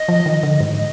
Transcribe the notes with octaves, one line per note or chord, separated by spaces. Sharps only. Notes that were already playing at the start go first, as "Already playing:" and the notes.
Already playing: D#5
F3
D#3
D3
G#2
D#5